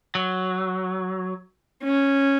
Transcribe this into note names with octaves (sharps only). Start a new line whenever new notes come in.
F#3
C#4